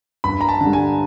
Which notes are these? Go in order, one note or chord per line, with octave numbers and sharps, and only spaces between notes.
G2 B5
A#5
A5
D3
G3
G#5